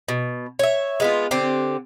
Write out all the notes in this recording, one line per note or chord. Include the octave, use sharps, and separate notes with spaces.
B2
C#5 E5
G#3 B3 F4
D3 C4 G4